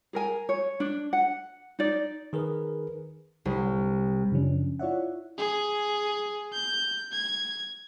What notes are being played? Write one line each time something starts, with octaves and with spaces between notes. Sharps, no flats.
G#4 A#4 G#5
C#5
D4
F#5
D#4 D5
D#3 G#4 A#4 B4
C2
F#2 C#3 F3 C#4 D4
E4 F4 C#5 D5 E5 F#5
G#4
G6
G#6